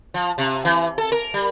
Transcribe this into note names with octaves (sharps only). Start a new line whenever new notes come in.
F3
C3
E3
A4
A#4
G3